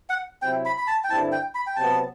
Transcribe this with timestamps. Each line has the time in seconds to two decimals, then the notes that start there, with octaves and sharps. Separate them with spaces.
0.09 F#5
0.42 C3 F#3 C4 E4 G5
0.65 B5
0.78 B5
0.87 A5
1.04 G5
1.09 G2 D3 G3 C4 E4 A5
1.32 G5
1.55 B5
1.67 G5
1.76 C3 F#3 B3 A5